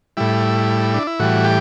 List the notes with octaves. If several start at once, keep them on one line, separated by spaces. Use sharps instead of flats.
A2 G3 E4
D4
E4
A2 E3 G3 F#4
G4